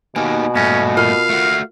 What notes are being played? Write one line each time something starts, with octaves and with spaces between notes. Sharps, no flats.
B2 A#3 D#4 G4 G#5
G2 A#2 A3 C#4 G#5 A#6
F4 A#4 F5 F6
A3 F#4